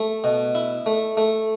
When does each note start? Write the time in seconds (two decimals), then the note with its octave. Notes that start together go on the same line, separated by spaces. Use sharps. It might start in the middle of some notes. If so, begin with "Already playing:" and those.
Already playing: A3
0.24 B2
0.55 E4
0.86 A3
1.17 A3